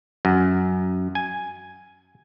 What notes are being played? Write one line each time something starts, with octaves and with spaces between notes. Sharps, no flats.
F#2
G#5